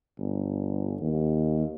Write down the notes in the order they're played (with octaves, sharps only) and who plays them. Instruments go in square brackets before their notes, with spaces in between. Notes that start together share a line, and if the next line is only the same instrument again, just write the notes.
[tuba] G1
D#2